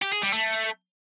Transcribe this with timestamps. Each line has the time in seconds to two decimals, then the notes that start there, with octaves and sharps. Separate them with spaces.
0.02 G4
0.12 G#4
0.23 G3
0.33 A3